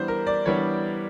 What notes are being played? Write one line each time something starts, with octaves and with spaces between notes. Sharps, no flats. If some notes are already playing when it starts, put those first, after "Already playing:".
Already playing: E3 G3 B3 D4 C5
A#4
D5
E3 G3 B3 D4 C#5